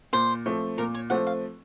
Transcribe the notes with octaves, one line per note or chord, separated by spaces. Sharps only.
A#2 C5
F3 A3 C4
A#2 A#4
C#5
F3 A3 C4 F#5
F5